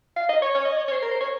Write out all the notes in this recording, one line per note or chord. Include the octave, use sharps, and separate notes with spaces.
F5
D#5
C#5
C#5
D#5
C#5
C#5
C5
A#4
C5
C#5